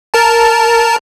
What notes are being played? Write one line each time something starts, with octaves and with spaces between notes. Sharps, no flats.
A#4 A5